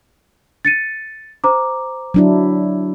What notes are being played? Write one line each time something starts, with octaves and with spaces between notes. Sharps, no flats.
A6 C#7 D#7
C5 A#5 D6
F#3 D4 E4